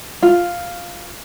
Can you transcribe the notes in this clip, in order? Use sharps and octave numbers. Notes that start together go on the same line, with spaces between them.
F4